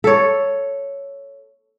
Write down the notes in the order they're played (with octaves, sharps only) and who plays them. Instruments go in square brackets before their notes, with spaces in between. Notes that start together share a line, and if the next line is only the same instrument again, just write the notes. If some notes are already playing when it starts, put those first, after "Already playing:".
[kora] A4 C#5